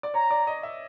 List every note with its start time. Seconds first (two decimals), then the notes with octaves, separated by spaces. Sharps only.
0.03 D5
0.14 C#5 A#5
0.31 D5
0.47 D#5
0.63 E5